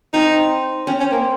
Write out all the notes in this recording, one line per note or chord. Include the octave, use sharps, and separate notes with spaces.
C4 D#4
C4 C#4
C#4
A#3